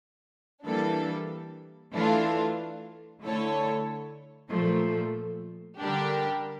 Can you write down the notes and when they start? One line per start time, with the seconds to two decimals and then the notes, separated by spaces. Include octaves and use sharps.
0.65 E3 G3 A#3 D4 A4
1.94 E3 A3 D4 F4
3.23 D3 A3 E4 A4 C#5
4.52 A#2 F3 A3
5.80 D3 G3 D4 G4 A#4